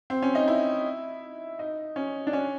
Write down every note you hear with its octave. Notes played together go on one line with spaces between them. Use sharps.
C4
C#4
D#4
E4
D#4
C#4
D4
C#4